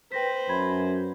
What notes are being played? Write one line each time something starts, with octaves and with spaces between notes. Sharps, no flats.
B4 C5 G5 A#6 B6
F#2 B5 G#6